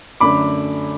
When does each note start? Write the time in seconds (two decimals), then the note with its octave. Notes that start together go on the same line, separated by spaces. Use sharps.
0.20 F#2 D3 A3 D4 B5 D6